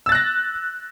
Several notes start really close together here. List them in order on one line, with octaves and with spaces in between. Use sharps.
E6 A6 F#6 A#6